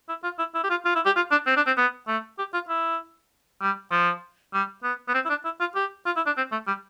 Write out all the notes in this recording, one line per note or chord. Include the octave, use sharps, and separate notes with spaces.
E4
F4
E4
E4
G4
F4
F4
E4
G4
F4
D4
C4
D4
C4
B3
A3
G4
F4
E4
G3
F3
G3
B3
B3
C4
E4
D4
E4
F4
G4
F4
E4
D4
C4
A3
G3